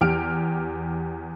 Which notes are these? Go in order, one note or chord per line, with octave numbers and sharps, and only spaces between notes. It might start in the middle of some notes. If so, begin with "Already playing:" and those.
E2 G4 F6 D7